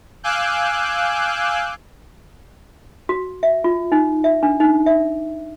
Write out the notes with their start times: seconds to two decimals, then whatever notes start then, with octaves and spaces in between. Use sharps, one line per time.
0.23 F5 G#5 D6 E6 F#6 G6
3.09 F#4
3.43 E5
3.64 F4
3.92 D#4
4.24 E5
4.43 D4
4.60 D#4
4.86 E5